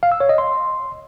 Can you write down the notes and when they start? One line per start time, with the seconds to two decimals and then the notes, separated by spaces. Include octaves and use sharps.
0.03 F5
0.12 E6
0.20 C#5
0.29 D#5
0.38 C6